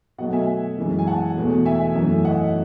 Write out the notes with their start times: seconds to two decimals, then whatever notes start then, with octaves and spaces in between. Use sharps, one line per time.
0.18 B2 F#3 A3 D#5 F#5
0.33 E5 G#5
0.77 F#2 E3 G#3
0.99 G#5
1.07 F#5 A5
1.36 E2 B2 A3
1.65 E5 G#5
1.94 F#2 E3 A3
2.24 D#5 F#5